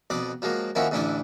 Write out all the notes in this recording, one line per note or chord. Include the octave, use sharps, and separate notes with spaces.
F2 B2 D5 D#6
F3 F#3 G#3 A#3
D#3 F3 A#3 C#4 E4 F#4
A1 D2 C#4 D4 E4 G#5